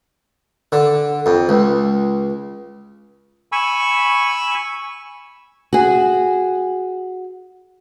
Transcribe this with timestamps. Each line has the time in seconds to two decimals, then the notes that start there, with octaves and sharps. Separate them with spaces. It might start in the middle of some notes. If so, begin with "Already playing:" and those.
0.72 D3
1.26 F2
1.49 C#2
3.52 G#5 B5 C#6 E6
5.73 F#4 G#4